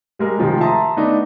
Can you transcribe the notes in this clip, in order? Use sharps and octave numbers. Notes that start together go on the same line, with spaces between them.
G3 G#3 A#4
C3 D#3 F3 G#3 A3
E5 A5 A#5 C6 D#6
A3 B3 D4 D#4